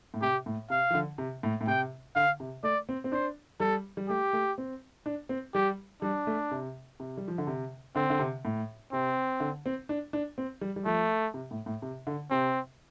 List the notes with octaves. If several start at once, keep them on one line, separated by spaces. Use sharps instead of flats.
A2
C3 G4
A2
C3 F5
F3
D3
C3
A2
A2
C3 G5
D3 F5
C3
A3 D5
C4
C4
D4 C5
G3 A4
G3
A3 G4
A3
C4
D4
C4
G3 G4
G3 D4
A3
C3
C3
G3
F3
D3
C3
D3 C4
D3
C3
A2
C3 C4
D3
C4
D4
D4
C4
G3
G3
F3 A3
C3
A2
A2
C3
D3
C3 C4